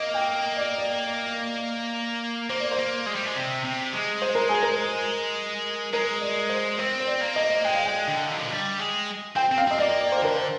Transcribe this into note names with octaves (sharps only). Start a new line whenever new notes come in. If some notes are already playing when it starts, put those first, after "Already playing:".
Already playing: A#3 D#5
G5
D5
D5
A#3 C5
D5
C5
A#3
G#3
G3
G#3
C3
C3
G#3
C5
A#4
G#4
A#4
G#3 A#4
D5
C5
C4 C5
C5
D5
A#3
D#5
G#3 G5
F5
G5
D3
D#3
F3
G3
G#3
C4 G5
C4
F5
C4 D#5
A#3 D5
D5
C5
D3 A#4
C5